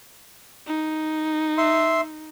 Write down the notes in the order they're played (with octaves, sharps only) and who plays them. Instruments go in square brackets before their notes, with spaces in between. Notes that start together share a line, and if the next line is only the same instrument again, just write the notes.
[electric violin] D#4
[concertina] E5 C6